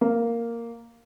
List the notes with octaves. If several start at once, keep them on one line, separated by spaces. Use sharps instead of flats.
A#3